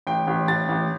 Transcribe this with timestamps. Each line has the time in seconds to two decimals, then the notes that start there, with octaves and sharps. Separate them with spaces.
0.07 A1 G5
0.27 A1
0.48 A1 A6
0.69 A1